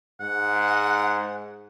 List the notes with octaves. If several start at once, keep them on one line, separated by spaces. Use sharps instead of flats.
G#2 F#5